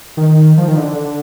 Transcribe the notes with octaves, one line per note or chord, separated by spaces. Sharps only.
D#3
F3
D#3
D3
D3
D3